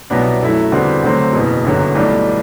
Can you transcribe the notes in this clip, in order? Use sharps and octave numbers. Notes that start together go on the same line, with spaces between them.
C2 B2 F#3 B3 D4
F#2 F#3 A3 E4
E2 D3 G3 C4 F#4
D2 D3 F#3 C4
F#1 E2 B2
G1 F#2 D3 F#3
B1 A2 G3 D4 A4